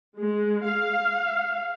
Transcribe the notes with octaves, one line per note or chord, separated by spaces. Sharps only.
G#3
F5